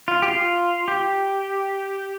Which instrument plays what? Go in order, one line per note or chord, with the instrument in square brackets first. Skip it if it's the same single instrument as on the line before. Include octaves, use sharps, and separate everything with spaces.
[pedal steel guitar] F4
G4
F4
G4